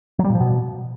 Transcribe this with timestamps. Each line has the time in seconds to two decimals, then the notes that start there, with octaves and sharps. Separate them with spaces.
0.19 F#3
0.24 G3
0.30 A#2
0.35 F3
0.40 B2